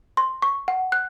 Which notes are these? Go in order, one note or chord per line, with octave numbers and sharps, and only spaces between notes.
C6
C#6
F#5
F#6